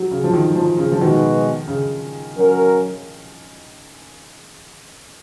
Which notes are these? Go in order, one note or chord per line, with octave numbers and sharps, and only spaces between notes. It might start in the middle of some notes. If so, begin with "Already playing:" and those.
Already playing: F#3
C#3
F3
D#3
F3
C#3
F3
B2 D#3 G#3 D#4 F#4 B4
C#3
F#3 C#4 F#4 A#4 C#5